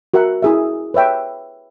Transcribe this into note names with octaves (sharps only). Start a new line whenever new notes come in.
F#4 A#4 E5 F#5
E4 G#4 E5
B4 C#5 E5 G5